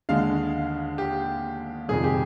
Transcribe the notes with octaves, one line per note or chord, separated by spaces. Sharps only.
D#2 D3 G#3 F5
G4
F2 C3 D#3 G3 G#4
G4